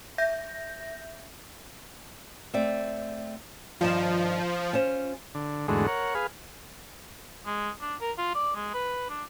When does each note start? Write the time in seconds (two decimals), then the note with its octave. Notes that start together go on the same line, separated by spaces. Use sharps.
0.18 E5 G6 A#6
2.54 A3 C4 D5
3.81 G2 D#3 F3 A5
4.73 C#4 F4 C5
5.35 D3
5.68 E2 G#2 D3 G#3 A3 F#4
5.87 A#4 C#5 F#5
6.15 G#4 B4 F5
7.46 G#3
7.81 D4
8.01 A#4
8.18 F4
8.35 D5
8.55 G#3
8.74 B4
9.10 D4